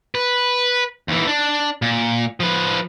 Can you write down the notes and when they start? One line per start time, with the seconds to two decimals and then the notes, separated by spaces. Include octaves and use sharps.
0.15 B4
1.08 D#2 E3
1.27 D4
1.82 A#2
2.40 F3 B4